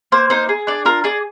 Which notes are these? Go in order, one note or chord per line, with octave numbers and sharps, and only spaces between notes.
A#3 C5
D#4 C5
G#4
D4 D5
F4 A#4
G#4 D5